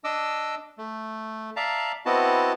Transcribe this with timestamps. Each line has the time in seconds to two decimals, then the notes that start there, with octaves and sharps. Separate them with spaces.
0.04 D4 D#5 D6 E6
0.78 A3
1.56 D5 E5 F5 A5 A#5
2.06 B3 C4 E4 F#4 D#5 A5